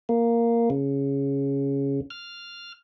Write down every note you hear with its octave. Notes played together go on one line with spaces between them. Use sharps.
A#3
C#3
F6